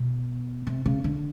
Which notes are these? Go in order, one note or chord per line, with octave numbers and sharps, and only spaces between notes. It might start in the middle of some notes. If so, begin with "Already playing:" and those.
Already playing: B2
C3
C#3
D3